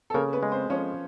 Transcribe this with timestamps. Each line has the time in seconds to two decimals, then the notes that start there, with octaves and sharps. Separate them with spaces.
0.10 A4
0.14 C#3 A#3 A#4
0.33 B3 B4
0.43 G#3
0.52 C4 C5
0.70 F3 C#4 C#5